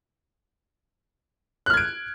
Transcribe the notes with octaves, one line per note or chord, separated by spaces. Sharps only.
F6 F#6 G#6 D7